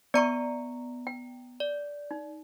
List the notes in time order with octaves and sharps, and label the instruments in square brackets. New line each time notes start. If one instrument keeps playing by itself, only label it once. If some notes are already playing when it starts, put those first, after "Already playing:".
[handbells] B3 A#5 C#7 [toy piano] D5 C#6
[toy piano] G5
[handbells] D5
[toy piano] D#4